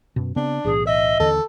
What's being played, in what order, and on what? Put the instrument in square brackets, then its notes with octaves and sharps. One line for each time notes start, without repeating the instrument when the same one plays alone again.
[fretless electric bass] F#2 B2
[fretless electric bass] C#3 B3 C4 [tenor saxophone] D4
[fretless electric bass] B1 A2 E3 [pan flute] G#4
[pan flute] D#5 [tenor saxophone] E5
[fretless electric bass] D#2 D3 E3 [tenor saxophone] A4